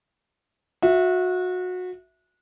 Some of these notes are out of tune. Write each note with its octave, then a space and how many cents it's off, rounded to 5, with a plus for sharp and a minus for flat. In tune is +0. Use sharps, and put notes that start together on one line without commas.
F#4 -25 E5 +0